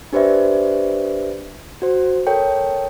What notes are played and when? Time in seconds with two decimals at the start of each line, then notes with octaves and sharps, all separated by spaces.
0.13 D4 G4 B4 C5 D5 E5
1.82 F#4 C5
2.27 A4 A#4 C#5 G5